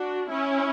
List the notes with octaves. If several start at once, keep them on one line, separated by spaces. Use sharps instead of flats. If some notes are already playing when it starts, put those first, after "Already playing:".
Already playing: D4 F#4
C#4 E4